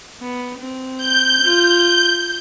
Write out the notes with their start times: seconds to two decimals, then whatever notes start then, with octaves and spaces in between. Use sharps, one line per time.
0.21 B3
0.58 C4
0.97 G6
1.42 F4